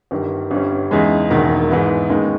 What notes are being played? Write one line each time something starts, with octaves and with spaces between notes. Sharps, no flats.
G1 G2 D#3 G3
G1 G2 G3 C#4
E2 C#3 G#3 D#4
E1 E2 D#3 A#3
G#2 E3 G#3 B3 E4
D#2 C#3 G#3 B3 D#4